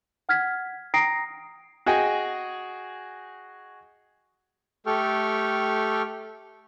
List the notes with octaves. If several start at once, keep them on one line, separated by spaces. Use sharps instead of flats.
F#5 F6 G#6 B6
G5 A#5 D#6 A#6 C7 D7
F#4 G#4 D#5 G5 G#5
A3 G4 A4 G5 C#6 F6